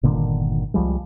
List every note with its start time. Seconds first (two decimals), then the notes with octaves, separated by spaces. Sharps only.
0.03 G1 A#2 D3 D#3
0.74 C2 F3 G3 G#3